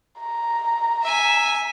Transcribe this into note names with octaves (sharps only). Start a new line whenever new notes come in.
A#5
E5 G#5